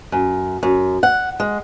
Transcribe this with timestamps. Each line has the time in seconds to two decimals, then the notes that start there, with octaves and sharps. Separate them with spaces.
0.12 F#2
0.63 F#2
1.03 F#5
1.40 G#3